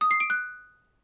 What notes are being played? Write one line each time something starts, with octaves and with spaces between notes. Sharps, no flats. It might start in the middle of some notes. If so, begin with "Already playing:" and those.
D#6
C7
D7
F#6